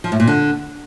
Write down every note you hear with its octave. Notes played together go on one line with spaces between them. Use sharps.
F3
A2
A#2
D3